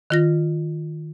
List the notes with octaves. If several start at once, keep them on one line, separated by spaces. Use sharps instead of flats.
D#3 F4 A#6